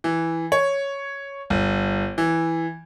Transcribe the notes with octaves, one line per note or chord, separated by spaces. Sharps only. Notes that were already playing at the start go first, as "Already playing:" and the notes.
E3
C#5
G1
E3